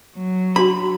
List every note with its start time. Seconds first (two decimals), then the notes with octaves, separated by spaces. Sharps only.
0.17 F#3
0.56 D4 F#4 A#5 B5